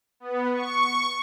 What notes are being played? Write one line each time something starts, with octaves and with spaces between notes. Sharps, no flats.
B3
C#6